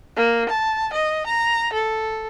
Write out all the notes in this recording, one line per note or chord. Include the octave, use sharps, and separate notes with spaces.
A#3
A5
D#5
A#5
A4